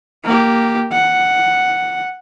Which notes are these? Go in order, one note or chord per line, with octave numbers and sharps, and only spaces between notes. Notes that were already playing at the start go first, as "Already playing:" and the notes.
A#3 G4
F#5